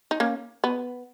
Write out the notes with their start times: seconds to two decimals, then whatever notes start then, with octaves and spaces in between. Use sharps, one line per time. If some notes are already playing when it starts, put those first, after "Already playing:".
0.11 D#4
0.20 A#3 C#4
0.64 B3